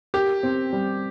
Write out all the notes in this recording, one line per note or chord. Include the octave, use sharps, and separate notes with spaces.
G4 A#4
C4
G3